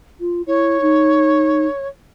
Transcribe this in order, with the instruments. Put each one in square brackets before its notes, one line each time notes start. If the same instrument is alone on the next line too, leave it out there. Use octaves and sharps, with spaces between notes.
[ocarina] F4
[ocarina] E4 [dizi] C#5
[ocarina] D#4